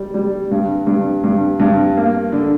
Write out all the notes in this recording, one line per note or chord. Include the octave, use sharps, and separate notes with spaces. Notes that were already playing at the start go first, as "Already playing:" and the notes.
Already playing: G3
G3
G2
G2
G2
G2
A#3
D3